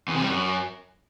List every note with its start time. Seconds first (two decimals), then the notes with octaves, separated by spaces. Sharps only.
0.08 E2
0.15 C3
0.22 G3
0.29 F#2